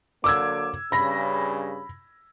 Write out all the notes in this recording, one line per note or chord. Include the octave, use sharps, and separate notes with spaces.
D3 F#3 A#3 D6 E6 G#6
G2 C#3 B5 A#6